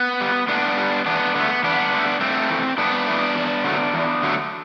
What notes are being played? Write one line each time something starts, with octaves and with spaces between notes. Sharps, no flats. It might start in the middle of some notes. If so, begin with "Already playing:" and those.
Already playing: B3
G3
A2 B3 D4
G3
E2 B3 D4
D3 A3 B3
E2 B3 D4
D3 A3
G2 A3 C4
E3 A3
G2 B3 D4
E3 A3
E2
D3 F#3 A3
E2
D3 F#3 A3